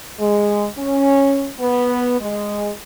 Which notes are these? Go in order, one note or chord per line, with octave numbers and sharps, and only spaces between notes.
G#3
C#4
B3
G#3